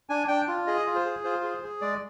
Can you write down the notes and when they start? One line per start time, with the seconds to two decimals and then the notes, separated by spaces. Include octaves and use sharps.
0.09 D4 G#5
0.28 D4 G5
0.48 F4
0.67 G#4 D#5
0.86 F4
0.95 C5
1.05 G#4
1.24 F4 C5
1.44 G#4
1.63 G#4
1.81 G#3 D5